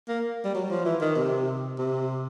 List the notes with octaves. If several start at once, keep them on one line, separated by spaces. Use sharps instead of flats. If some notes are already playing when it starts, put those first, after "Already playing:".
A#3
G3
F#3
F3
E3
D#3
C3
C3